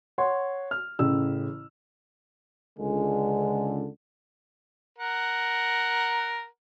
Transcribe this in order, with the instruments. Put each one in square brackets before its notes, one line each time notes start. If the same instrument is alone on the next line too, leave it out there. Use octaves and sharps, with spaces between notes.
[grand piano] C#5 F#5 C6
F6
A1 C#3 E6
[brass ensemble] C#2 D3 [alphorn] G#3
[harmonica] A#4 F#5